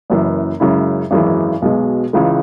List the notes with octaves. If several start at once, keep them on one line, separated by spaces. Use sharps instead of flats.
F#1 F#2 E3
F#2 C#3 G#3 E4
G#1 F#2 E3 G#3
B1 B2 G#3
C#2 C#3 E3 G#3